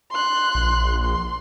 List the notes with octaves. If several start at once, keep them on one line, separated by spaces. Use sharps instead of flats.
C6 F#6
A#1
C6